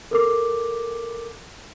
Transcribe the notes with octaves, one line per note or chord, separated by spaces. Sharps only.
A4 A#4 D6